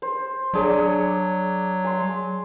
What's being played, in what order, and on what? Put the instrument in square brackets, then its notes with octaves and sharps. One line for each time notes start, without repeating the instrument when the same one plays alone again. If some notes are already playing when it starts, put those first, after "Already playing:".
[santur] C5
[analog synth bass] F#3 [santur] D4 G#4 C#5
[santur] G#5 C6